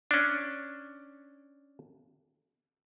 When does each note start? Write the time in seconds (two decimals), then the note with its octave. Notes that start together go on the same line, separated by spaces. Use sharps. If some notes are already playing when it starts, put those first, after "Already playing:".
0.11 C#4 D4